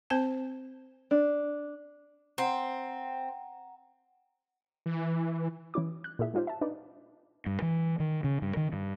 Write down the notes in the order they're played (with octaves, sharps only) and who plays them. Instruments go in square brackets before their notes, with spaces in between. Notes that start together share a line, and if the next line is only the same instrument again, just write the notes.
[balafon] C4 C5 A5
[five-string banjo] D4
[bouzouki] C4 [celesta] F#5 A#5
[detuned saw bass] E3
[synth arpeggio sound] E3 C#4 E4 D6
F#6
A#2 E4 G#4 E5
G#3 D#4 F4 G4 C5
E5 A5
D4 D#4 B4 D5
[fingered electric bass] G2
E3
D#3
C#3
G2
D#3
G2